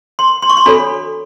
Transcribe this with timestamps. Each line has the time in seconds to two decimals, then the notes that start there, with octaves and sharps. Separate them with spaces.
0.19 C6
0.42 C6
0.50 C#6
0.57 C6
0.66 D4 F#4 A4 C#5 B5